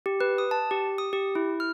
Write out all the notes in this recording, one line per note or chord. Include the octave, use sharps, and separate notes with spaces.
G4
B4
D#6
A5
G4
D#6
G4
E4
F6